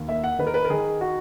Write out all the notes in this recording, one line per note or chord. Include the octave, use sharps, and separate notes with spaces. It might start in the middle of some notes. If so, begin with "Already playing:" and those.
Already playing: D#2
A#3 E5
F#5
D#3 B4
A#4
B4
A#4
D#3 G#4
F#4